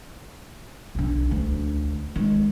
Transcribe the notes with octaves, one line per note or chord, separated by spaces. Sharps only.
B1 D3
D2
D#3 G#3